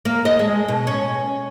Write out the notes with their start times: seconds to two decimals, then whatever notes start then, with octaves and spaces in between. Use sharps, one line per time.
0.05 A#3
0.25 D#5
0.39 G#3
0.68 B2
0.87 C#4